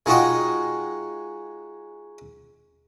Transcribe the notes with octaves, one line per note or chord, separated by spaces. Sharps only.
G#3 D#4 F4 F#4 D#5 G5